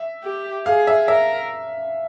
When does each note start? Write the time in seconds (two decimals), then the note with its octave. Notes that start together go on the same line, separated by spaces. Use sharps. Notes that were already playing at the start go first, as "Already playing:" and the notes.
Already playing: E5
0.24 G4
0.66 G#4 F5
0.87 E5
1.08 A#4 E5